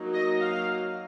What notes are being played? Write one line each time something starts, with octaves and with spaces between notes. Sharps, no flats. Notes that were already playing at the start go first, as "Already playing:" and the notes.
Already playing: F#3 A#3 D#4
D#5
F5